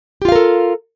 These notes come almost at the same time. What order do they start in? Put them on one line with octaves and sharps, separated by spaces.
G4 F4 F5 A#4 A4